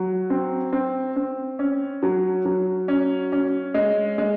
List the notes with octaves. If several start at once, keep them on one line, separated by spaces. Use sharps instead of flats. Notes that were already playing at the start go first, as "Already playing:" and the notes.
Already playing: F#3
C4
C4
C4
C#4
F#3
F#3
C#4
C#4
G#3
G#3